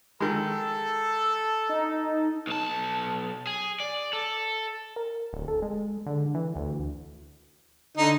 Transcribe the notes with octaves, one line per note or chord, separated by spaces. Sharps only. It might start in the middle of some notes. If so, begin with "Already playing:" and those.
D#3 G#3 A4
D#4
B1 A5
G#4
D5
A4
A#4
D1
A4
G#3
D3
E3
D2
D3 D#4